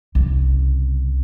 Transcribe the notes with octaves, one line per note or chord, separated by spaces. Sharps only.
C2 C#3